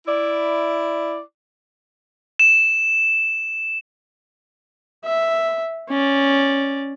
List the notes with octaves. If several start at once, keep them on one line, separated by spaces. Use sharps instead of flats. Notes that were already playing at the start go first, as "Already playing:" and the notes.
E4 D5
E7
E5
C#4 D5